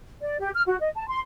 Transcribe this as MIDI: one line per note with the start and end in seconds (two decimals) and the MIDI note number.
0.22 0.37 74
0.40 0.50 67
0.54 0.62 89
0.66 0.77 66
0.81 0.90 75
0.95 1.05 81
1.09 1.20 84